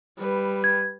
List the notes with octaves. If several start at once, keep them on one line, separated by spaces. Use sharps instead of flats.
G3 B4
G#6